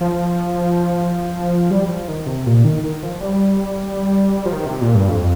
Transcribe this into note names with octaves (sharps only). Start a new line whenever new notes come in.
F3
G3
F3
D#3
C3
A#2
D#3
D#3
F3
G3
F3
D#3
C3
A#2
G2
F2